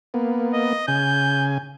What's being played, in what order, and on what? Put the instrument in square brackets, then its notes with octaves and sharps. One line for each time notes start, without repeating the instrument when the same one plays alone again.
[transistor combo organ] A#3 B3
[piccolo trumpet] D#5
[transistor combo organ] C#3 G#5 [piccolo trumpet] G6